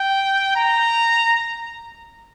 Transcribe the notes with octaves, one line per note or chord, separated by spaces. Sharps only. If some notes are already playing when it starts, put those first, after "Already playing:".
Already playing: G5
A#5